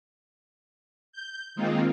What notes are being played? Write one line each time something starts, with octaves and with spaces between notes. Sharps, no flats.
G6
D#3 G#3 A#3 C4 D#4 F4